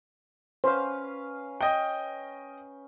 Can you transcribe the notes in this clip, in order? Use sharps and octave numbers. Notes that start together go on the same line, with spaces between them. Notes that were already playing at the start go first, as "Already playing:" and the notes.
C#4 B4 C5 F5
D#5 G5